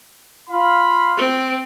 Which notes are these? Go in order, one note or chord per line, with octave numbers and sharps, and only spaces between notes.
F4 F5 B5
C4